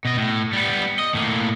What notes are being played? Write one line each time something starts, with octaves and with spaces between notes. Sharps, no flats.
B2 D#5
A2
G3 B3
D#5
A2 A#3